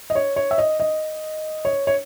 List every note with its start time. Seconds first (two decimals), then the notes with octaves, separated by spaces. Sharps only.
0.10 D#5
0.15 C#5
0.36 C#5
0.51 E5
0.58 D#5
0.80 D#5
1.65 C#5
1.87 C#5